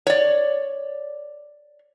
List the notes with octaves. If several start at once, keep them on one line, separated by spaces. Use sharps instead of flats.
C#5 D5